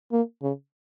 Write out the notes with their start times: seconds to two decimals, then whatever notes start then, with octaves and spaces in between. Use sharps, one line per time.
0.12 A#3
0.42 C#3